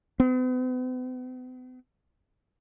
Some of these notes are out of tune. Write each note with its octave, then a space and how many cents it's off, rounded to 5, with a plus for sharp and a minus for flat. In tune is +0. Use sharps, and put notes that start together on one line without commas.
B3 +45